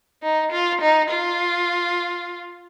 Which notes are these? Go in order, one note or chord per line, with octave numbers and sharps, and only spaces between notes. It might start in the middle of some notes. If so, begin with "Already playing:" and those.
D#4
F4
D#4
F4